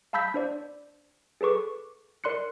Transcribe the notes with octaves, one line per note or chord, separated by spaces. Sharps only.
F5 A5 B5 E6 G6 B6
D4 C5 D5
G#4 A4 B4 C#6 D6
A#4 D5 C6 F#6 C#7